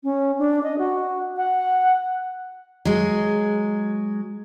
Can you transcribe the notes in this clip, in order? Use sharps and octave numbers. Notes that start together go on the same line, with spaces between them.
C#4
D4
D#5
F#4
F#5
F#3 G#3